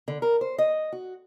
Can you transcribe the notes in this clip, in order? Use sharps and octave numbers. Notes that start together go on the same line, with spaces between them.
D3
A#4
C5
D#5
F#4